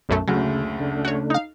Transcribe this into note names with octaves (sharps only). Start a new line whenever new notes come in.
B1 F#2 A3
F#1 D2 C#3 F#3 G#4
C#3 A3 D4
F#4 C#5
D#4 F5